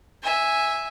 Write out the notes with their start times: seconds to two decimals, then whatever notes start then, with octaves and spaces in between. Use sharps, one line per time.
0.23 E5 G#5